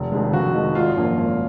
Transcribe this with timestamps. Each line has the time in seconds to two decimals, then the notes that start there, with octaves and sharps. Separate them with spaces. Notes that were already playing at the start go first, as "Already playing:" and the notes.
Already playing: F1
0.12 F2 D#3 G#3
0.33 F1 F#4
0.54 F2 D#3 G#3 D#4
0.75 G#1 F4
0.97 F#2 F3 A#3
1.19 G#1